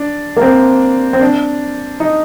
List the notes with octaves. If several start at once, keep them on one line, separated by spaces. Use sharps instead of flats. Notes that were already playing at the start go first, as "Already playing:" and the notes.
Already playing: D4
A#3
C4
C4
D4
D#4